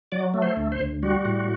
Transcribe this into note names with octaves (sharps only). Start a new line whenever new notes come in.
F#3 D5
A3
C5
D2
C5
D2
G3 F#4
A2